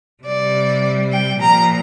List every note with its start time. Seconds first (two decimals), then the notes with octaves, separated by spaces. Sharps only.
0.24 C3 G3 D5
1.11 G5
1.39 A#2 F3 A#5